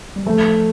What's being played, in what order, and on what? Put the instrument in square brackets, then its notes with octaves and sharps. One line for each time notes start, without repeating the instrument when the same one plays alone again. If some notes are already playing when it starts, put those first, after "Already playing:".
[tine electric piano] G3
[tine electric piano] F3 [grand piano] A3